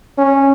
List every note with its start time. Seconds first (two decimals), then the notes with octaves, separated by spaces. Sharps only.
0.18 C#4